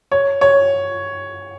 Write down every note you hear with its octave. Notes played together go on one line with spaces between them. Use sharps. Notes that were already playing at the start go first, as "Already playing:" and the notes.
C#5
C#5